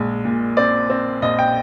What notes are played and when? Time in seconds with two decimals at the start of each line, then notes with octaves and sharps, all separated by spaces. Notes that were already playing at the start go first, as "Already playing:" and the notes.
Already playing: A#1 G#3
0.25 A#2
0.57 C4 D5
0.90 C4
1.22 A#1 D#5
1.39 G5